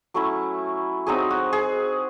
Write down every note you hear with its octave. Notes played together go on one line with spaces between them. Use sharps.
F#3 A3 C#4 E4
F#3 C4 D#4 G#4
F#4
G#4